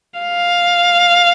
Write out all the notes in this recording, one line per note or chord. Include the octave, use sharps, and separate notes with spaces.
F5